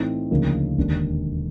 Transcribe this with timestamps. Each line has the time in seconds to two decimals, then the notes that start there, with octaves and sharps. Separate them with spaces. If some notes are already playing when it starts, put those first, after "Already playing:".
Already playing: A2 E3 A3 C4 D#4
0.31 D2 C#3 F3 A#3 D#4
0.77 E1 D#2 D3